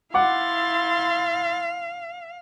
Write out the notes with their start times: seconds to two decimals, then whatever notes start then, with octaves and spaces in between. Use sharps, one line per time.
0.14 E4 F5 F#5 C6 D6 A6